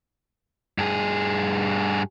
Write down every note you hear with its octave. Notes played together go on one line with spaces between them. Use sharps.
G2 G#4